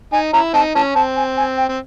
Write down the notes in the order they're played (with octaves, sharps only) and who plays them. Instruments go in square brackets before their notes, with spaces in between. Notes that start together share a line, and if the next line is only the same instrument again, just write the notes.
[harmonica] D#4 [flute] G#5
[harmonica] C#4 E4 [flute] A#5
[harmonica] C4 D#4 [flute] A5
[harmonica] E3 C#4 [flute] A5
[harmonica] C4 [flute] A5
[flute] G#5
G#5
G5
[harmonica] C4